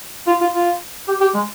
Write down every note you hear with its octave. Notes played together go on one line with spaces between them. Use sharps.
F4
F4
F4
G4
G4
G#3